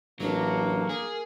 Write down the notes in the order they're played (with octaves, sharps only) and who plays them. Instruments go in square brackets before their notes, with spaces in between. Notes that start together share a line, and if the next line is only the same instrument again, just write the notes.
[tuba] A1 [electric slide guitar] F#3 [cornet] A#3 [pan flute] D4
[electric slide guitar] G#4 [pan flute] A#4